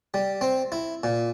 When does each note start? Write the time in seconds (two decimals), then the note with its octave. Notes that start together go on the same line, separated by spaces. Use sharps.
0.14 G3
0.41 C4
0.72 E4
1.03 A#2